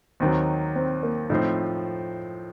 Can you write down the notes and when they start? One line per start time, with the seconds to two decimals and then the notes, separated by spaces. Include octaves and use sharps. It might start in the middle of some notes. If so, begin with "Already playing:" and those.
0.20 D#2 D#3 F#3 C4
0.76 C4
1.03 A#3
1.30 A2 F3 C4 D#4